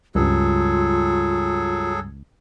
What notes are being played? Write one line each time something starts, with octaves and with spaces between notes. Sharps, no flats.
C#2 G2 F#3 G3 F4 G#4 A4